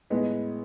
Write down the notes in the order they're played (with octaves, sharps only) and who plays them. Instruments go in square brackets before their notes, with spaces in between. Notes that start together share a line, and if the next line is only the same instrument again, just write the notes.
[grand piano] A2 G#3 B3